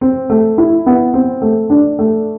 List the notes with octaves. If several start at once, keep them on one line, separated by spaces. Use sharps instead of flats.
C4
A3
E4
B3
C4
A3
D4
A3